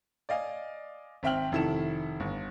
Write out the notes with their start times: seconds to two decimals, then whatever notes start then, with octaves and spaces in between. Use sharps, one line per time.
0.29 D5 D#5 F5 G#5
1.23 G#1 C4 E5 G5 F6 F#7
1.52 F1 D#3 E4 A4 E7
2.20 G1